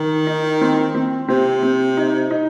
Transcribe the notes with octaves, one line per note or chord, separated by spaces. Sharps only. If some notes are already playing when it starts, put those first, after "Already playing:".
Already playing: D#3
D#4
C4
C4
C3 C4
C4
D#4
D#4